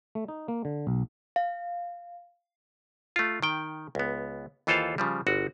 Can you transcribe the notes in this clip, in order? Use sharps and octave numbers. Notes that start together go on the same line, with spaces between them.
A3
D#4
A#3
D3
B1
F5
A3 F4
D#3 G5
C#2 B3
D#2 E3 F4 A4 C5 F5
C#3 F3 G3
G1 F#4